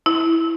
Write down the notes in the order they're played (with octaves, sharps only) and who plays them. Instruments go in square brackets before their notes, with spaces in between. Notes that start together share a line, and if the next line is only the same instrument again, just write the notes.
[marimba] E4